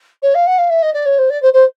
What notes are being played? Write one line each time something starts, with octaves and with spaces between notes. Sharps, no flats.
C#5
F5
F#5
F5
E5
D#5
D5
C#5
C5
D5
C5
C5